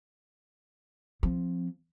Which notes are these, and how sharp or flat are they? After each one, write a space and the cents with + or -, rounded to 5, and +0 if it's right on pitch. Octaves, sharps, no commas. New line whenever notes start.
F3 +0 C4 +0